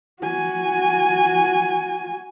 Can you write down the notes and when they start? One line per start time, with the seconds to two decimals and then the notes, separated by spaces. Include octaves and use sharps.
0.23 F#4 G#5